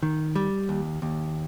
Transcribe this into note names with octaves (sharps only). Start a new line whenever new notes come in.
D#3
G3
D#2
D#2